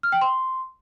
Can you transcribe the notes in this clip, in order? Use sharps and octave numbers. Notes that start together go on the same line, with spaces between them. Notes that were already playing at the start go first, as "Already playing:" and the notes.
F6
G5
C6